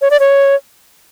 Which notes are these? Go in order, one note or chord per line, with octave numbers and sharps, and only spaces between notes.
C#5
D5
C#5